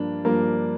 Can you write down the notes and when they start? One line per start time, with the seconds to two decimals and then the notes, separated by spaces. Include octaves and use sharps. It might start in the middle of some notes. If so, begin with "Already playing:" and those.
Already playing: G2 F3 A#3 D4
0.25 G2 F3 A#3 A#4